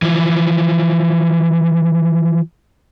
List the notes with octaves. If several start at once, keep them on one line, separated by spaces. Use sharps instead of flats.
E3 F3